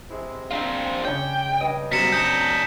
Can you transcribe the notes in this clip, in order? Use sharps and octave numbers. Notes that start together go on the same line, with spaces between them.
C3 G#3 E4
C4 D4 F4
C#3 G#3 D4 C#5 G5
G2 D#5
F#2 B2 G3 C4 A#5 B6 C#7 E7
D4 D#5 G6 C#7 E7